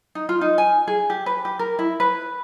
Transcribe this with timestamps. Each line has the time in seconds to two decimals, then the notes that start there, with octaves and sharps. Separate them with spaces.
0.15 D#4
0.29 F4
0.41 D#4
0.58 G#5
0.88 G#4
1.10 G4
1.26 B4
1.45 G4
1.59 A#4
1.79 E4
2.00 B4